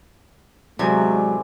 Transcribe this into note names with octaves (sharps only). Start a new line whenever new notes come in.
E2 A2 C3 F#3 G#3 D5 G#5